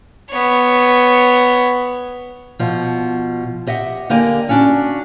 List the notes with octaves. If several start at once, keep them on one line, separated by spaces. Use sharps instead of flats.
B3 C#5
B2 F3
G4 D#5 E5 F#5
D3 A#3 G4 D#5 G#5
C#4 D4 F#4